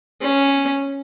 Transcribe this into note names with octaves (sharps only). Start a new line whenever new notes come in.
C#4